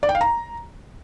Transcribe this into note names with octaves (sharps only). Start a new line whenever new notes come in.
D5
G5
F5
A#5